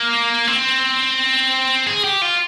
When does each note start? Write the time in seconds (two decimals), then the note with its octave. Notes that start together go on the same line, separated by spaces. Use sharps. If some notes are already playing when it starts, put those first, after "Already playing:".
Already playing: A#3
0.47 C4
1.87 G#4
2.04 G4
2.22 F4